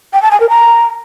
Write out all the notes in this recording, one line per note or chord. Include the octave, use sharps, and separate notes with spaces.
G5
A5
G#5
A#4
A#5